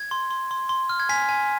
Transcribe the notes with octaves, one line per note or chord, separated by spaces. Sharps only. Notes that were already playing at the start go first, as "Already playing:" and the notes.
Already playing: G#6
C6
C6
C6
C6
F6
G#6
G#5 B6
G#5